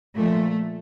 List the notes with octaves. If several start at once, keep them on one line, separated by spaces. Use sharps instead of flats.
A#2 F3 A3